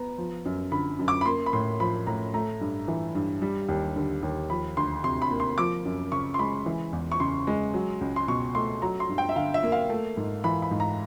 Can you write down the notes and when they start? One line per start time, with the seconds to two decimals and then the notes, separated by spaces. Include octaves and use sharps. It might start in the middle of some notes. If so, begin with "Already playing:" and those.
Already playing: B3 A#5
0.18 F3
0.45 F#2
0.72 D3 B5
0.99 F#2
1.08 D6
1.21 B5
1.25 A#3 C6
1.46 B5
1.53 A2 C6
1.80 F3 B5
2.07 A2 A#5
2.34 A3 A#5
2.61 G2
2.88 E3
3.15 G2
3.42 G3
3.68 D#2
3.96 D3
4.23 D#2
4.50 F3 B5
4.77 D2 C6
5.04 C3 C6
5.22 B5
5.31 A#3
5.40 C6
5.58 F3 D6
5.85 F#2
6.12 C#3 C#6
6.34 C6
6.39 G#3 B5
6.66 E3
6.93 E2
7.12 C#6
7.20 C#3 C6
7.47 G#3
7.74 F#3
8.01 C#2
8.16 C6
8.28 B2 C#6
8.55 A3 C6
8.82 F#3 A#5
9.00 C6
9.09 G2
9.18 G5
9.29 E5
9.36 D3 F5
9.54 E5
9.63 A#3
9.72 F5
9.90 A3
10.17 G#2
10.44 E3 B5
10.62 B5
10.71 G#2
10.80 A#5